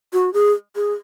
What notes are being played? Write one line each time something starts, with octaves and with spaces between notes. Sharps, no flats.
F#4
G#4
G#4